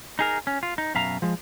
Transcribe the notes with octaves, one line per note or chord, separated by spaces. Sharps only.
D#4 G#4 A#4
C#4
F4
D#4
F#2 B2 E5 F5 A#5
F3 G#3